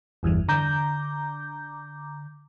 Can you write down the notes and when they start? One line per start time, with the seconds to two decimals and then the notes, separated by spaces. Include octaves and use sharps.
0.23 G1 E2 G2 E3
0.48 D3 A#5 D6 G6